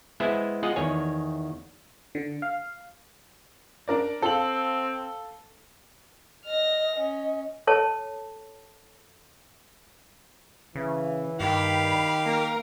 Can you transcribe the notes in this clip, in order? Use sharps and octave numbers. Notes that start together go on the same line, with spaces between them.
G#3 B3 E4 C5 E5
G#3 F4 D#5 F#5
E2 D#3 C#5 G#5
D3
F5
D4 A#4 D5
C4 A4 F5 F#7
D#5 F6 A#6
C#4 D#5
A4 C#5 A5
C#3 E3
G2 D#3 G4 F5 B5
A#3 A#4